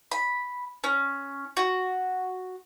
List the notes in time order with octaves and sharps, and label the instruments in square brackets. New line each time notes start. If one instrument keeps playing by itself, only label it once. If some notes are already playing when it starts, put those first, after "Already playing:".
[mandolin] B5
C#4
F#4